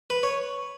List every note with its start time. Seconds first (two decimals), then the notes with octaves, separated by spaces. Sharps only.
0.10 B4
0.23 C#5